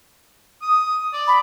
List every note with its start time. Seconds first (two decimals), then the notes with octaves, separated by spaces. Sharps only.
0.62 D#6
1.13 D5
1.28 B5